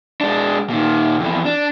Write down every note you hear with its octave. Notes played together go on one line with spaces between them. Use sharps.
G#3 D4
A#2 D#3
F2 E3
D4